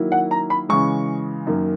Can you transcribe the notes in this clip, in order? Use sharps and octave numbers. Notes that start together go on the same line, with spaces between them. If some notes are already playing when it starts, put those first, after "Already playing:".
Already playing: D#3 F#3 A#3 E4
F#5
A#5
B5
C#3 E3 G#3 C#6
F#2 D#3 A#3